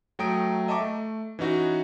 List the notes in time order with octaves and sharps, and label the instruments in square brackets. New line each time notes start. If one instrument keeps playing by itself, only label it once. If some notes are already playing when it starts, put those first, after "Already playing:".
[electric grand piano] F#3 A3 G5 A#5 D#6 D7
D#5 E5 A5 A#5 C#6 D6
A3
E3 C#4 D#4 F#4